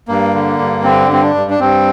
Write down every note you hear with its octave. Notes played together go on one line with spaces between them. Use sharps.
G2 A#3
D3
G2
D3 C4
G2 C4
D4
G2
D4
G2 C4